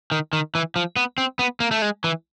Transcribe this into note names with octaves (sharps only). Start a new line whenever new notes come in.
D#3
D#3
E3
F3
B3
C4
B3
A#3
A3
G#3
E3